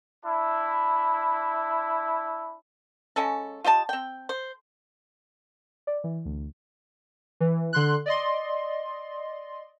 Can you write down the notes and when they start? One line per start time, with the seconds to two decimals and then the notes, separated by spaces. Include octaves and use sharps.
0.24 D4 E4
3.16 C#3 G#3 C#4 A4
3.64 F4 G4 D#5 A5
3.89 C4 G5
4.29 C5
5.87 D5
6.04 E3
6.25 D2
7.40 E3
7.73 D3 C6 F#6
8.06 D5 D#5 C6